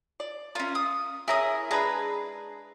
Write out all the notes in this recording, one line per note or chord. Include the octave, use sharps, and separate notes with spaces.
D5
C#4 F4 A#4
D#6
C#4 E4 G#4 A#4 D#6
G#3 D4 G#4 B4 A#5